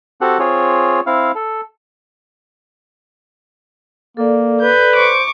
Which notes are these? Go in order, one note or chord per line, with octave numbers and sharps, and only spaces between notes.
C4 F#4 G4 A4 F#5
C4 F4 G#4 C#5
C4 E4 F5
A4
A#3 A4 D5
B4 G6
C5 C#6 D6